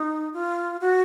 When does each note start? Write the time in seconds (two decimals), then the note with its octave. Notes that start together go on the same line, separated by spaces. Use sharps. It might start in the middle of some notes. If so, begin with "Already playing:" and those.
Already playing: D#4
0.34 F4
0.81 F#4